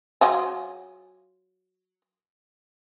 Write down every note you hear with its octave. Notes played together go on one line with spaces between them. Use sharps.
F#3 F4 G#4